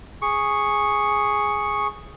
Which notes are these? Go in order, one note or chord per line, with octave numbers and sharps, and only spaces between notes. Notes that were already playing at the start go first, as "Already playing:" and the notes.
G#4 C#6